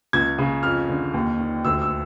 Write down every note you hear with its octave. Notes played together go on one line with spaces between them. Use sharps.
C#2 G#6
C#3
F2 F6
D3
D#2
D#3
D2 E6
E6